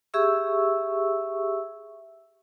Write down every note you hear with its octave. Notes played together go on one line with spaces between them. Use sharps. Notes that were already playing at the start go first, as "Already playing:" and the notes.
G4 G#4 E5 C#6 E6